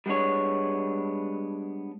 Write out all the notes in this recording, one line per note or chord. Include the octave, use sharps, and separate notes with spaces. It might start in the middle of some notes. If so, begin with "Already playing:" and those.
G3 G#3 B3 D4 C#5